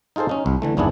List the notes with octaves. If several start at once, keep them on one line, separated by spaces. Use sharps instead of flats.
D#4 F4 G#4 A4 C5
C#4 D#4
C2
D3 E3 A3
G1 D#2 B3 D4 E4 G#4